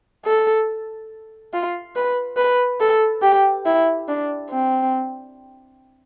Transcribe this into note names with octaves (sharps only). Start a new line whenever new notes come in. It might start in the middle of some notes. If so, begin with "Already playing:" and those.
A4
F4
B4
B4
A4
G4
E4
D4
C4